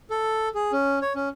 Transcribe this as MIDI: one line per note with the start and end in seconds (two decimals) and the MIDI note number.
0.10 0.49 69
0.55 0.72 68
0.72 0.99 61
1.02 1.13 73
1.15 1.29 61